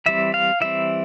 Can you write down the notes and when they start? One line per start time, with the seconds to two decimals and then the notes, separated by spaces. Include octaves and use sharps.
0.06 E3 G3 C4 E5
0.34 F5
0.61 E3 G3 C4 E5